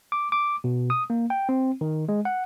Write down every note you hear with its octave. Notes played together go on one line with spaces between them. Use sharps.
D6
D6
B2
D#6
A#3
G5
C4
D#3
G#3
F#5